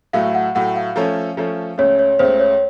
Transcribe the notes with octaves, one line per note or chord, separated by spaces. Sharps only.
A2 F#3 A3 F5
F#5
A2 F#3 A3 F#5
F5
F3 A3 C#4 A4 C#5
F3 A3 C#4 A4 C#5
C#2 C#3 A3 C#5
C#5
C#2 C#3 A3 C5
C#5